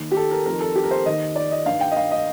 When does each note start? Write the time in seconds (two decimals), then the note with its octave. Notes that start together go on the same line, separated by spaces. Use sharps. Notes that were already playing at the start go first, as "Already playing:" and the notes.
Already playing: D#2 D#3
0.11 G4
0.17 A4
0.31 A#4
0.46 F2 D#3 A#4
0.60 A4
0.75 G4
0.84 A#4
0.91 C5
1.06 D#2 D#3 D#5
1.36 D5
1.51 D#5
1.66 G2 D#3 F5
1.81 G5
1.91 D#5
1.96 F5
2.11 D#5